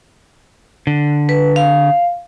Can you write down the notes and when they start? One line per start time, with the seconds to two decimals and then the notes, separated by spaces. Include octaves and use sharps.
0.87 D3
1.29 B4
1.56 F5